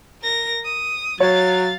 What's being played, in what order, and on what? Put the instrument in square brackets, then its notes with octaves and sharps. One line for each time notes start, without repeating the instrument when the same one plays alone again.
[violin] A#4 A#6
D#6
[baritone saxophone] F#3 [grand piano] C#5 [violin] F5 A6